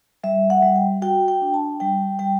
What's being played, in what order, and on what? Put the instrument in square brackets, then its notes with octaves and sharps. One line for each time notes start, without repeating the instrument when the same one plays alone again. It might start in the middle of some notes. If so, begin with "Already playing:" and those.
[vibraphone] G3 E5
F#5
G3
G5
F#4 G5
G5
D4
A5
G3 G5
G3 G5